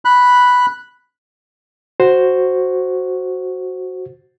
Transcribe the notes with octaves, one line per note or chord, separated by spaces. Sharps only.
B5 F#6
F#4 C5